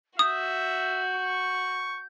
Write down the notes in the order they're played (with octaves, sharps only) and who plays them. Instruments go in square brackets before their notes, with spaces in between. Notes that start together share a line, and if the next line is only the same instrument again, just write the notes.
[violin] F#4 [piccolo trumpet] E5 [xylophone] D#6 [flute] G6
[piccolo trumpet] C#6